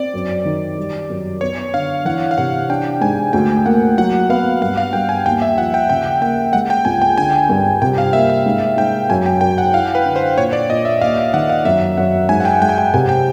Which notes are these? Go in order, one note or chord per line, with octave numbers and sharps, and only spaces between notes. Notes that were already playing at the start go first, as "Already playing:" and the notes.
Already playing: C4 D5
F#2
D#3
G3
F#2
B3 C#5
D3 F5
E3 F#5
F5
C3 F#5
D4 G5
G#2 G#5
D2 G5
A#3 F#5
F#3 F#5
B3 F5
G2 F5
F5
G2 G5
G#5
D#2 G5
E5
F3 F#5
G5
C#3 G5
A#3 G5
G#3 F#5
G5
C#2 G#5
G5
D3 G#5
G2
C3 G5
F5
A#3 E5
E5
G#2
G#2 G5
F#2 G#5
G5
F#2 G5
F#5
E4 F5
B4
D3
C5
A#2 C#5
D5
A#2 D#5
E5
D#2 F5
D#3 F#5
F5
F#2 E5
F#2 F#5
G#2 G#5
F#5
G5
G#3 G5
G#5
G5
C3 G#5
G5